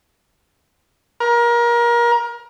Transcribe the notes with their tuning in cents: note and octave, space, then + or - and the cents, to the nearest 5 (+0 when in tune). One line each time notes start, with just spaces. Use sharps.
A#4 +30